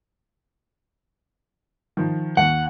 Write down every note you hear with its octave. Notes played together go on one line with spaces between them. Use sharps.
D#3 F3
D#2 D#3 F#5